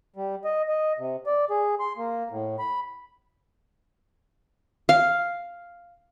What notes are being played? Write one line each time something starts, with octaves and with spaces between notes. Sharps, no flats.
G3
D#5
D#5
C3
D5
G#4
C6
A#3
A2
B5
F5